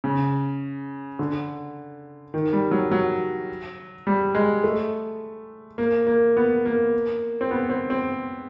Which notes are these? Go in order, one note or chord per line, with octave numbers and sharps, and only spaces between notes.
C#3
D3
D#3
G3
F#3
F#3
G3
G#3
A3
A#3
A#3
B3
A#3
C4
B3
C4
C4